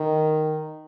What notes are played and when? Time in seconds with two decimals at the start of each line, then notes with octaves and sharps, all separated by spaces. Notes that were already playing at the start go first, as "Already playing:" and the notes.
Already playing: D#3